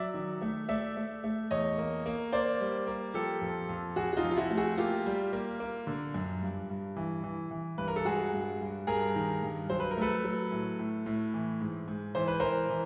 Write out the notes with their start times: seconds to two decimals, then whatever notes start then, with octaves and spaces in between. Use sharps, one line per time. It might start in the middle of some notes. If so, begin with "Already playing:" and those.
Already playing: F#3 D5 E5
0.14 D#3
0.41 A3
0.69 A3 D5 E5
0.97 A3
1.24 A3
1.51 E2 C#5 D#5
1.78 A#3
2.06 A#3
2.32 A#3 C5 D5
2.60 G3
2.87 A#3
3.14 F3 G4 A4
3.41 F2
3.69 F2
3.96 F2 F#4 G#4
4.13 F#4
4.17 D#4 F4
4.24 F2
4.31 F4
4.37 E4 F#4
4.50 A3
4.58 F#4 G#4
4.78 A#3 F4 G4
5.06 G3
5.33 A#3
5.60 A#3
5.87 D3
6.14 F#2
6.42 G2
6.70 G2
6.96 E3
7.24 E3
7.51 E3
7.78 G2 B4
7.88 A#4
7.96 A4
8.05 G#3 F#4 G#4
8.33 G2
8.61 G2
8.87 G2 G#4 A#4
9.16 D#3
9.43 G2
9.70 F#3 C5
9.80 B4
9.91 A#4
9.97 A3 A4 B4
10.24 F#3
10.52 A2
10.79 A2
11.06 A2
11.34 E3
11.61 G#2
11.88 G#2
12.15 E3 C5
12.28 B4
12.40 E3 A#4 C5
12.70 E3